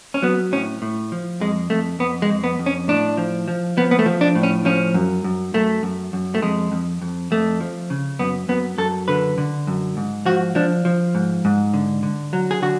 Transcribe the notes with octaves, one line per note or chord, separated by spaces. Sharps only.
C#4
F#3 B3
A2 C#4
A2
F3
F2 G#3
F2 A3
F2 B3
G#3
F2
B3
F2
C#4
A2 D4
F3
F3
F3 B3
B3
A3
F3
D4
A2
C#4
F3 C#4
F#2
F#2
F#2 A3
F#2
F#2
A3
F2 G#3
F2
F2
F2 A3
F3
C#3
F#2 B3
F#2 B3
F#2 A4
D3 B4
D3
F#2
G#2
F3 F#4
F3 D4
F3
G#2
G#2
D3
D3
F#3
G#4
D3 F#4